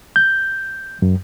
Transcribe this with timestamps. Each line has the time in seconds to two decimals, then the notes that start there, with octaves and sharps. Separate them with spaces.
0.16 G6
1.02 F#2